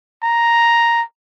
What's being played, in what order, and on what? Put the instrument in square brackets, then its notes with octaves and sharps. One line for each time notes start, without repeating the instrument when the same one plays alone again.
[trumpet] A#5